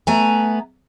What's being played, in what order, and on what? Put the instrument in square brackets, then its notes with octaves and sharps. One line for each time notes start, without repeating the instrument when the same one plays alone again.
[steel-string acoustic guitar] A3 B3 G#5 A#5